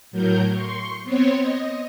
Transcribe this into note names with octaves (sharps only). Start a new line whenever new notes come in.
A2 F#3 A#4 G6
C6 C#6
B3 C4 C5 C#5
D#5